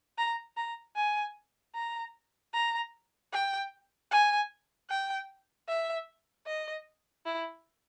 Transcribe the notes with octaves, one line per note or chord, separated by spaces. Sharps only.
A#5
A#5
G#5
A#5
A#5
G5
G#5
G5
E5
D#5
E4